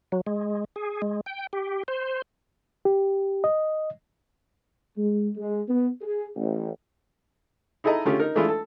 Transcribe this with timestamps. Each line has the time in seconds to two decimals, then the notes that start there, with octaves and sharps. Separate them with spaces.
0.12 F#3
0.27 G#3
0.76 G#4
1.02 G#3
1.26 G5
1.53 G4
1.88 C5
2.85 G4
3.44 D#5
4.98 G#3
5.36 G#3
5.68 B3
6.01 G#4
6.36 A1
7.84 D#4 E4 G#4 A4 D#5 A#5
8.05 D3 A3 C#4 F4 G4 G#4
8.19 D#4 A#4
8.35 E3 G#3 A3 D4 E4 F4
8.49 A4